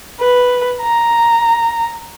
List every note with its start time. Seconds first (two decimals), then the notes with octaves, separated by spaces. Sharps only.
0.20 B4
0.82 A#5